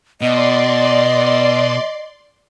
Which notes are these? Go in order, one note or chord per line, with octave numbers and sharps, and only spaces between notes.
B2 D5 D#5 C6